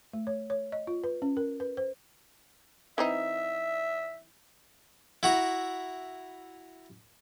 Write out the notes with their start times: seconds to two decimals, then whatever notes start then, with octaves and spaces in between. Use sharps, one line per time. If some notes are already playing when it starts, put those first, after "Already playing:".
0.13 A3
0.27 C#5
0.50 C#5
0.72 D#5
0.87 F4
1.04 B4
1.22 C#4
1.37 A#4
1.60 B4
1.77 C5
2.98 E3 C4 D#4 E5
5.23 E4 F#4 A#5